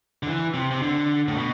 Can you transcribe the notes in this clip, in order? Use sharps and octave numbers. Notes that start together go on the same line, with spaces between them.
D3
E3
C3
C3
D3
A2
B2